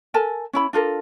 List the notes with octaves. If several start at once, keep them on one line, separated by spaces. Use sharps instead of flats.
A4 A#4 G#5 A5
C#4 E4 B5
D4 F4 A4 A#4